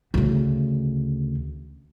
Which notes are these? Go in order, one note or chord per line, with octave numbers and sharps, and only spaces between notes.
D2 C#3